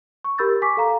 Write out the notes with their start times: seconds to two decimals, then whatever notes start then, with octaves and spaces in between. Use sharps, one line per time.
0.24 C#6
0.38 G4 A#4 B5 E6 G6 A6
0.62 G#5 C#6 D6 B6
0.77 A4 F5 A#5